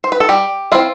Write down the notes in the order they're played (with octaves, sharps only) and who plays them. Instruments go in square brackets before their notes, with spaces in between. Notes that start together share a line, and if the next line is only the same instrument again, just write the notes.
[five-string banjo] C5
B4
A4
G3 G4
C4 E4 F4